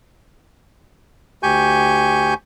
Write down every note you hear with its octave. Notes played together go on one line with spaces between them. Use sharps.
D2 G4 G#5 C#6 G6